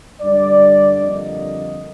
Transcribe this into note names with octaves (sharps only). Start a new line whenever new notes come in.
G2 D3 G3 D5
F2 D3 G3 A#3 D#5